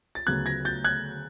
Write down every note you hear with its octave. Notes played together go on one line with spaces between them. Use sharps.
A6
D2 C#3 F#3 B3 F#6 G#6
G#6 A#6
G6 A6
F#6 G#6